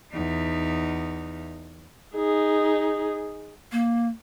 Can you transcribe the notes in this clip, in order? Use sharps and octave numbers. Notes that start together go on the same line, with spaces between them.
E2 D#4
D#4 G#4
A#3